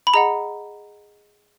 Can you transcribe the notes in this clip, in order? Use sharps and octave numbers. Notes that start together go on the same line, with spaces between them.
B5
G#4 D#5 F#5 A#5